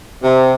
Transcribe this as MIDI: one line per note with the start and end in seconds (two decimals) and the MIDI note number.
0.23 0.53 48